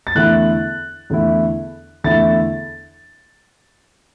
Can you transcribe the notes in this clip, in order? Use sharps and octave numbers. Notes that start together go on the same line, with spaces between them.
A6
E2 D3 A3 E4 F#6
E2 D3 A3 E4
E2 D3 A3 E4 A6